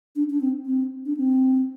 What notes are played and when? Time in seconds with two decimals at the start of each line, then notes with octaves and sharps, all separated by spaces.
0.16 D4
0.30 D4
0.41 C4
0.66 C4
1.06 D4
1.17 C4